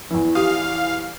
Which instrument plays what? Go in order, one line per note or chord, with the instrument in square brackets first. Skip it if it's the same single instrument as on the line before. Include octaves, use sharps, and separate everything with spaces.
[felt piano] E2 E3
[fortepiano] G4 D#6 [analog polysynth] F5